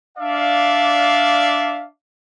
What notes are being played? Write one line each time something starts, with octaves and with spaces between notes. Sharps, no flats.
D4 D5 E5 F5